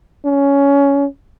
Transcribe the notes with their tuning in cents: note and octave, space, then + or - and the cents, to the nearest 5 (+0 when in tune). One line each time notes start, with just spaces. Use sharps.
C#4 +15